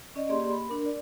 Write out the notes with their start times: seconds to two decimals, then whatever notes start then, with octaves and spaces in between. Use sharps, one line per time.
0.15 C#4 D5 D#5
0.29 A#3 G4 G#4 D5 C6
0.51 B5
0.69 D4 A#4
0.85 D5